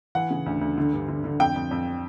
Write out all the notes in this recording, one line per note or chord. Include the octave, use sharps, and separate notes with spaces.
E3 F#5
C#3
D2
D2
D3
G2
D3
D3
F2 G5
F2
F2